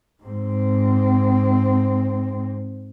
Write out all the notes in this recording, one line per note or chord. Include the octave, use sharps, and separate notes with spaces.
G#2 C4